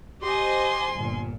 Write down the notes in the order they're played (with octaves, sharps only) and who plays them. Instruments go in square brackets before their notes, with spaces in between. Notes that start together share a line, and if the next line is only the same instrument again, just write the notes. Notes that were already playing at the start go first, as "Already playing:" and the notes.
[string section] G4 C5 D#5 [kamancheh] G#5 C6
[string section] G1 A#2